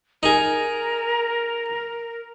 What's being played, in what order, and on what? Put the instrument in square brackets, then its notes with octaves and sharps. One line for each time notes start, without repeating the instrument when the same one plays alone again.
[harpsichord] D#4 G#4 [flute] A#4